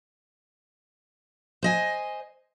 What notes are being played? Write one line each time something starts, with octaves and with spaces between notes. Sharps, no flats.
C5 D#5 G#5